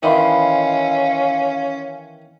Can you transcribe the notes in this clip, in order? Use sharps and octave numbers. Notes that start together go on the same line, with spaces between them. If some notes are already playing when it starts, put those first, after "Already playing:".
D#3 E3 C#4 D#5 F5 B5 C6